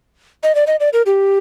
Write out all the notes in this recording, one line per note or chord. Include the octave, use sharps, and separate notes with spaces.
D#5
D5
D#5
D5
A#4
G4